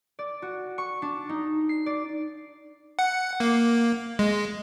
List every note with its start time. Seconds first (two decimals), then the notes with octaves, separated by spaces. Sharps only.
0.19 D5
0.42 F#4
0.78 C#6
1.02 D4
1.29 D#4
1.69 C7
1.86 D5
2.99 F#5
3.40 A#3
4.19 G#3